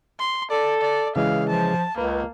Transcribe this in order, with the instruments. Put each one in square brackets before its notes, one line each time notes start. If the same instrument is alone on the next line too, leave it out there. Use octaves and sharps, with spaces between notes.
[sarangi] C6
[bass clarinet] A4 [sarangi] D5
[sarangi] D5
[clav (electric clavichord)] C#3 E3 G#3 [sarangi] F5
[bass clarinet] F3 [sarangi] A5
[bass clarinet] C#2 [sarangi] A#3 [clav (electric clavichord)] B4